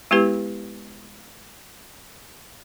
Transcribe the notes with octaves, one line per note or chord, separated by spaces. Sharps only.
G#3 B3 E4 G4 B4